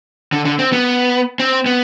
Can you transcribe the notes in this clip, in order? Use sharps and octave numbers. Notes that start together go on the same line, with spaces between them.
D3
D3
C4
B3
C4
B3